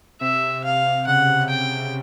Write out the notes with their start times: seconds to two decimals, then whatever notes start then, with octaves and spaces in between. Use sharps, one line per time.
0.21 C3 E5
0.64 C3 F5
1.07 C#3 F#5
1.49 C#3 G5